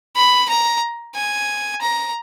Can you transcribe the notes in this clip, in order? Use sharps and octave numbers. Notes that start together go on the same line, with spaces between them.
B5
A#5
G#5
A#5